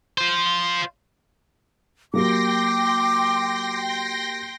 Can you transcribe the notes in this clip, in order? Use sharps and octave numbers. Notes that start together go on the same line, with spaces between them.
F4 C5
F#3 A#3 G4 G5 C6 D6 A#6